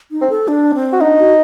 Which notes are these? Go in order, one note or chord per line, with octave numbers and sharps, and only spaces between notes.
D#4
C4
A4
D4
C4
F#4
D4 D#4
F#4